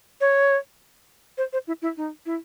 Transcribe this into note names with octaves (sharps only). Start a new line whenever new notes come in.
C#5
C5
C5
E4
E4
D#4
E4